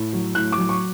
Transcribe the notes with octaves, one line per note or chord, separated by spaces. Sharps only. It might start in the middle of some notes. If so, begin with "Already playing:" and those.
Already playing: A2
F#3
A2 F#6
D6
F#3
C#6